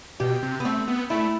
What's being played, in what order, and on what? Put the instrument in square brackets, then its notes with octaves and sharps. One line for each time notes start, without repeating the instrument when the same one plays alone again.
[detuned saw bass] B2 [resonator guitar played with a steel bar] G4
[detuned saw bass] C3
[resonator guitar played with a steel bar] B3
[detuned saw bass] A3 [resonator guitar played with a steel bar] C4
[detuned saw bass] B3
[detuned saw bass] A3 [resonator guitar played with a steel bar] E4